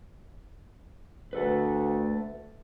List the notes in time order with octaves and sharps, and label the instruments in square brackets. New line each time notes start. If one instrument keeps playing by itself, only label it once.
[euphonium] D2 [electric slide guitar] A3 A4 B4